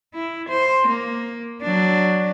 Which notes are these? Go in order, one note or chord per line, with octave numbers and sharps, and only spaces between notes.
E4
C5
A#3
F#3 D4